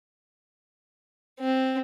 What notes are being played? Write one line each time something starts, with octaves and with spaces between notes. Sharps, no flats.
C4